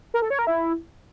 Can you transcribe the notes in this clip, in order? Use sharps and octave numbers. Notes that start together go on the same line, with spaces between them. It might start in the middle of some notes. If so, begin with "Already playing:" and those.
A#4
A4
C#5
A#4
E4